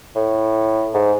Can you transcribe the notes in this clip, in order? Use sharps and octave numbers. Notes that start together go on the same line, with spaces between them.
A2
G#2